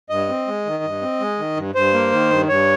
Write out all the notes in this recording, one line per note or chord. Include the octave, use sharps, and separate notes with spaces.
G2 D#5
C4
G#3
D#3
G2
C4
G#3
D#3
G2
G2 C5
A#3
D#3
G2
G2 C#5